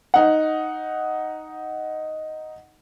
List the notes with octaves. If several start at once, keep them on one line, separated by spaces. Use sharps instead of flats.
D#4 F#5